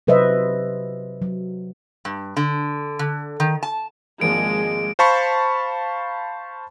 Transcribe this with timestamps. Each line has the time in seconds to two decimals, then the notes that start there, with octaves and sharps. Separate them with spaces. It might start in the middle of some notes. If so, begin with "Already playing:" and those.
0.07 C3 F#3 B4 C5 D#5 E5
1.22 F#3
2.05 G2
2.37 D3
2.99 D3
3.40 D#3
3.63 A5
4.21 G#1 F3 G#3 A#3 D7
4.99 C5 F5 A5 B5 C#6